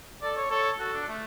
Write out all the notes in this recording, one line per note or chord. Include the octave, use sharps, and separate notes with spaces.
A4 D5
C#5
A4 C#5
F#4 A4
D4
A3